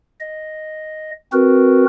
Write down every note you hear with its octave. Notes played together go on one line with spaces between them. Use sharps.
D#5
C4 F#4 A#4 B4